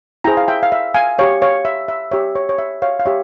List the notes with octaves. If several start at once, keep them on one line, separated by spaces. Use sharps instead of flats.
E4 G#4 C5 G5 A#5
F5
E5 G5
F5
E5
F5 G#5
G4 C#5 F5
C#5 F5
E5
E5
G4 C#5 E5
C#5
C#5
E5
C#5 F5
F5
G4 C#5 E5